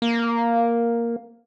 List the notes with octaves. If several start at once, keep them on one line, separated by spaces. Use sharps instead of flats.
A#3